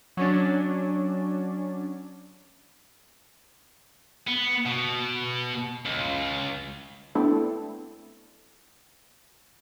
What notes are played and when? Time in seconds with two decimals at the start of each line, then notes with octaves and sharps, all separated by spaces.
0.17 F#3 C#4 D4
4.27 B3
4.66 B2
5.86 C#2
7.15 A3 B3 C4 D4 E4 A4